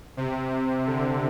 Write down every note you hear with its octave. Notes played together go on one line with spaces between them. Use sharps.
C3
D3